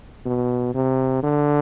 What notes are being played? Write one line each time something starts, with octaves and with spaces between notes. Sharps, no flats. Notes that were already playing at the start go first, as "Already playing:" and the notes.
B2
C3
D3